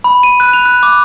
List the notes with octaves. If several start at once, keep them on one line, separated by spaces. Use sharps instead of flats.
B5
D#7
F#6
F7
F#6
D6